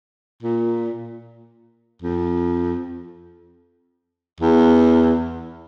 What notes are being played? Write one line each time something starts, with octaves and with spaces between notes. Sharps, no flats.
A#2
F2
E2